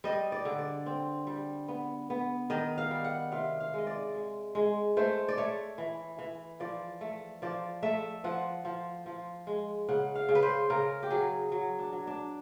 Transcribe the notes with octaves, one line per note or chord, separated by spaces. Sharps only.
G3 D#5
D5
D3
D5
C4
G3
B3
B3
D#3 D#5
F5
G3
F#5
C3 F5
F5
G#3 D#5
D5
G#3
G#3
A3 C5
D5
A3 C#5
E3
E3
F3 D5
A3
F3 D5
A3 E5
F3 F#5
F3
F3
G#3
C#3 F#5
F5
C#3
B4
C5
C#3 A#4
G4
F#3 G#4
F#3
D4
F#3
D4